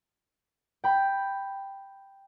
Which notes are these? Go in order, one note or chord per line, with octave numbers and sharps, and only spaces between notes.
G5 B5